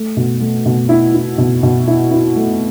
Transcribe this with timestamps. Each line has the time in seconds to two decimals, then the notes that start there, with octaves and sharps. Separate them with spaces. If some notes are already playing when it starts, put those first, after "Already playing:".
Already playing: A3
0.17 B2
0.40 A3
0.66 B2
0.89 E4
1.14 E4
1.38 B2
1.63 B2
1.88 E4
2.11 E4
2.36 A3